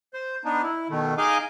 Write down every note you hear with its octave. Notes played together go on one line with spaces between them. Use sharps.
C5
B3 D4 D#4
E4
B2 D#3 A3
D#4 G#4 D#5 F5 G#5 D6